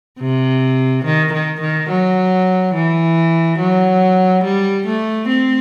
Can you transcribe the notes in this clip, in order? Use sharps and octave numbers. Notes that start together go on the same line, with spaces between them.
C3
D#3
D#3
D#3
F#3
E3
F#3
G3
A3
C4